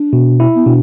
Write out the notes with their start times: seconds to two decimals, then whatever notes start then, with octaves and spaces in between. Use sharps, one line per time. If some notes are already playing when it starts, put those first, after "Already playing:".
Already playing: D4
0.13 B2
0.40 E4
0.55 B3
0.66 B2 D4